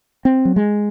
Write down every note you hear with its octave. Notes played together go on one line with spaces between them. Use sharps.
C4
F#3
G#3